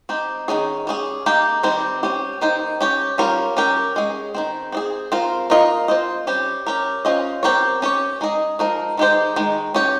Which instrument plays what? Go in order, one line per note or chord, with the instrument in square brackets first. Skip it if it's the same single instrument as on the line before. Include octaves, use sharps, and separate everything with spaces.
[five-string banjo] C4 D#4 G4
D#3 G#3 C#4 G#4
G3 C#4 G#4
A#3 D#4 G4
D#3 G3 C4
C#4 G4 C5
D#3 A#3 D#4 G4 C5
C#4 G4 C#5
G3 C#4 F4 A#4 C#5
C#4 G4 A#4
G#3 C#4 G#4
D#3 G#3 C4
C4 D#4 G#4
C4 F4 A#4
A#3 F4 A#4 D#5
C4 F4 C5 D#5
G3 C#4 G4 C5
C#4 G4 A#4
C#4 F4 C5 D#5
C4 G4 A#4 C#5
C#4 G4 C#5
G#3 D#4 G#4 D#5
F3 G#3 D#4 A#4
D#3 G#3 D#4 G4 C5
D#3 G#3
C#4 G4 C#5